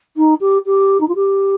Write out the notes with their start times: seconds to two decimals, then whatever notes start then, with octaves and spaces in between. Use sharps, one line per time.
0.17 D#4
0.41 G4
0.66 G4
1.00 D#4
1.08 F4
1.15 G4